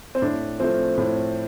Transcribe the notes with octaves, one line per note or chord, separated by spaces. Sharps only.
C4
A2 D4
F3 A3 C4
A2